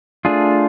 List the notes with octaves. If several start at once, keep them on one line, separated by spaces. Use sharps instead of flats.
A3 D4 F4 G#4